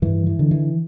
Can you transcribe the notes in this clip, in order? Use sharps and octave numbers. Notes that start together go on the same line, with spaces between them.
G2 E3
E3
D3
E3